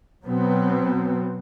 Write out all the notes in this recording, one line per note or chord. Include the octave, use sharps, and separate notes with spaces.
B2 F#3 B3 C4